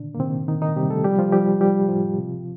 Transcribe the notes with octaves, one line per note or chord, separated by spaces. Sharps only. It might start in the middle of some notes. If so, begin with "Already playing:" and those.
Already playing: A#2 D3 D#3 D4
A#3
C3 D#3 C4
D#3 D#4
D#3 D#4
C3 G3 G4
A3 A4
F3 G3 G4
F3 F4
F3 G3 G4
F3 G3 G4
A2 F3 F4
C3